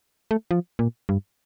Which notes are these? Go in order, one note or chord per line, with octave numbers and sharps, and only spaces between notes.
A3
F3
A#2
G2